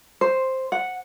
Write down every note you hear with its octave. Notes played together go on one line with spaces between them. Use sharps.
C5
F#5